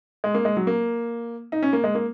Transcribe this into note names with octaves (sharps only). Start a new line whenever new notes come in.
G#3
A#3
G#3
F#3
A#3
D#4
C#4
A#3
G#3
A#3